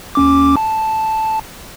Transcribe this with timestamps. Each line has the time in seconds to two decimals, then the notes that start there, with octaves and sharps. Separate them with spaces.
0.15 D#2 C#4 D6
0.57 A5